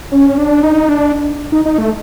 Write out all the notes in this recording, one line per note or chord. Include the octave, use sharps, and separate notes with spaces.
C#4
D4
D#4
D4
D#4
D#4
A3